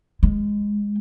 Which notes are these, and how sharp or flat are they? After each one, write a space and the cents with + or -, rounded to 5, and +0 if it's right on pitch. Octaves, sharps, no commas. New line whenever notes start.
G#3 -10